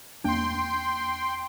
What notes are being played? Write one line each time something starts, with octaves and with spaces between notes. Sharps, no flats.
E2 A#3 D4 G5 C6